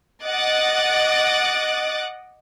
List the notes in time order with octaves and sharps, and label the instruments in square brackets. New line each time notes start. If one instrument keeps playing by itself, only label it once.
[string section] D#5 F#5 D6 D#6 F#6 A6